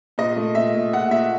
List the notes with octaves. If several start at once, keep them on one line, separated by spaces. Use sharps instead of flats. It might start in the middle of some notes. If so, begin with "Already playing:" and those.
A#2 D#5
A3
A#2 E5
A#2
A#2 F#5
A#2 E5